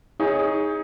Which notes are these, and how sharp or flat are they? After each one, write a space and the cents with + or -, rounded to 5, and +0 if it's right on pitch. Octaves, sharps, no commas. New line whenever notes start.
D#4 +20 G#4 -15 C#5 +10